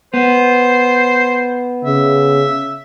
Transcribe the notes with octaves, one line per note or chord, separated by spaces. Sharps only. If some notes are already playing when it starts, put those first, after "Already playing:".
B3 C5
C#3 E5